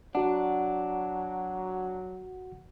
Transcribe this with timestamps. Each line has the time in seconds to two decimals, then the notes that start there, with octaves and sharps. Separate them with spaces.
0.15 F#3 D4 F#4 F#5